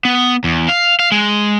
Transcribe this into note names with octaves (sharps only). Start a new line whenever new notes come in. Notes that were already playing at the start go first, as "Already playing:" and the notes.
B3
E2
F5
F5
G#3